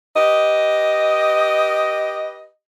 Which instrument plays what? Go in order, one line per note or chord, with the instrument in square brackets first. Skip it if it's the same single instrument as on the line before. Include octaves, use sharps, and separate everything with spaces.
[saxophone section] G4 B4 D#5